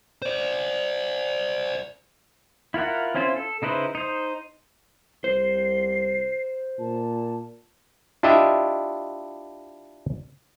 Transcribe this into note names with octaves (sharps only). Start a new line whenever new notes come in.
C5 D5
E4 F4 A#4 F#5
C4 C#4 E4 F4 C5
A4
C#3 D#4 E4 B4 C5
D#4 C5
C2 C5 C7
A#2 A5
D4 E4 F4 G4 D#5 E5